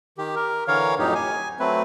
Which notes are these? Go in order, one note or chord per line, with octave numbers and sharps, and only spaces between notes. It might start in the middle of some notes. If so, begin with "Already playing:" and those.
D#3 G4
A#4
D3 E3 A#4 C#5 F5
F2 A2 F#3 D#4 G4
G#5
F#3 A3 C4 B4